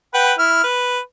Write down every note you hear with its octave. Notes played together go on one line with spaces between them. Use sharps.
B4 F#5 G5
E4 F6
B4